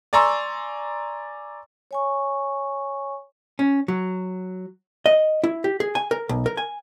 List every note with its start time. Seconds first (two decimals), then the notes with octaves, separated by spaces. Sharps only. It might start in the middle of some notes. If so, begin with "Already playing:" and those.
0.13 D5 G#5 A#5 C6 C#6 E6
1.91 C#5 G#5 C#6
3.59 C#4
3.88 F#3
5.06 D#5
5.44 E4
5.64 G4
5.80 G#4
5.95 G#5
6.11 A#4
6.29 B1
6.46 A#4
6.57 G#5